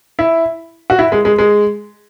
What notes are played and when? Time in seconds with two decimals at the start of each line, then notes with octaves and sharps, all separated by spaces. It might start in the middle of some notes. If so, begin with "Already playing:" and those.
0.19 E4
0.90 F#4
0.99 E4
1.12 G#3
1.25 G#3
1.38 G#3